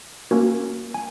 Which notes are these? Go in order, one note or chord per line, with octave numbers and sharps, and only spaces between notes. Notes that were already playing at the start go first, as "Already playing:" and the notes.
A#3 C#4 F#4 A#4
G#5